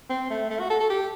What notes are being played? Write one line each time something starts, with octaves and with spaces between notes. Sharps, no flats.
C4
A3
A3
F#4
A4
A4
G4